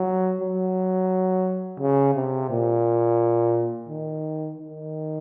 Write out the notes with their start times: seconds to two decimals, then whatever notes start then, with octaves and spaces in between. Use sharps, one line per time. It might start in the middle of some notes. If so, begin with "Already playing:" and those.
Already playing: F#3
0.41 F#3
1.80 C#3
2.15 C3
2.50 A#2
3.89 D#3
4.58 D#3